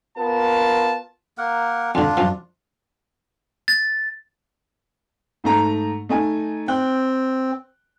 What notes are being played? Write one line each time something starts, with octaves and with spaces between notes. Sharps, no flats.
B3 F4 A#4 A5
A#3 A#4 F#5
F2 D3 D4 F4
F#2 F3
A6
G#2 A3 A#5
A3 D#4 G#5
C4 G5 F#6